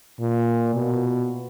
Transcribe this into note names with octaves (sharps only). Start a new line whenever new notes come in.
A#2
B2